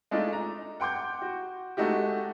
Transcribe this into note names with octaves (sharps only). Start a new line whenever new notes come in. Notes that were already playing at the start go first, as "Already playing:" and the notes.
G#3 A3 D4 D#4 F4
A#5
F#5 G5 C6 D6 G6
F#4
G#3 A3 D#4 F#4 G4